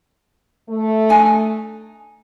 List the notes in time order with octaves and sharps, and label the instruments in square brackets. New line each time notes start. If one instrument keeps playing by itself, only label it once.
[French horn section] A3
[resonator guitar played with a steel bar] D4 D#4 G#5